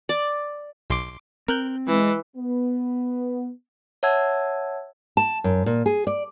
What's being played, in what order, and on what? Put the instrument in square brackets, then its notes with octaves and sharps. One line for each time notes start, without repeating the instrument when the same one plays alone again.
[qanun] D5
[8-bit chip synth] B1 C6 D6
[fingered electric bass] C4 [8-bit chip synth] A#4 F#6 G6
[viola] E3 [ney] G#3
[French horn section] B3
[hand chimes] C#5 E5 F#5 A5 E6 G#6
[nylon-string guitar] A5
F#2
A#2
G#4
D5